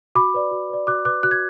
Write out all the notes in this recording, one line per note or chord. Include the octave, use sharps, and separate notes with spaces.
F#4 B5 D6
B4 D5
F#4
B4 D5
F#4 D6 F#6
B4 D5 D6 F#6
F#4 F#6
G#6